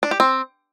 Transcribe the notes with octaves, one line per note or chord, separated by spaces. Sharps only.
D4
G4
C4